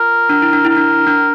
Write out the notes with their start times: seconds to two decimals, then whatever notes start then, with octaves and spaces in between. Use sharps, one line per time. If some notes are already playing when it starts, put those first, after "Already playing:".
Already playing: F4 A#4
0.29 D4
0.42 E4
0.53 D4
0.65 E4 A#4
0.76 D4
1.07 D4